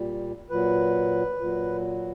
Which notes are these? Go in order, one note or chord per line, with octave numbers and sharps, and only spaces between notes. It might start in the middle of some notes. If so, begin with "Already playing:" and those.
Already playing: A#2 G3
A#2 F#3 B4
A#2 F#3